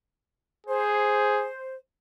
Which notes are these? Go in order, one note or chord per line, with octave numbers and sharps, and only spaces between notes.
G#4 C5